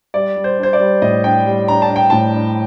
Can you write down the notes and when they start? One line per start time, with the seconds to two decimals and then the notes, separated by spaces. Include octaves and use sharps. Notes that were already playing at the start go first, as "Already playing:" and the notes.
0.14 G3 D5
0.36 G3
0.44 C5
0.58 D4 C5
0.73 D5
0.80 G3
1.02 A2 D#5
1.24 D4 G5
1.46 G3
1.68 D4 A#5
1.82 A5
1.90 D4
1.96 G5
2.10 A2 A5
2.34 D4